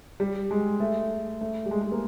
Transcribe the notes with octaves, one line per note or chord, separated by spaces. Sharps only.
G3
G#3
A3
A3
G3
G#3
G#3
A#3